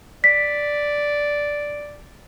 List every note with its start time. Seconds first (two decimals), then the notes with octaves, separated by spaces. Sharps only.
0.24 D5 B6